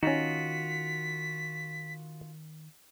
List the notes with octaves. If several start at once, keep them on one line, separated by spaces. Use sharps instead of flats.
D#3 C#4 D#4 F4 F#4 B6